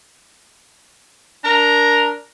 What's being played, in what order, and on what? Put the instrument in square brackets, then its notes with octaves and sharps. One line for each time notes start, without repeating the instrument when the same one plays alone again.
[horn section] D4 A#4 A#5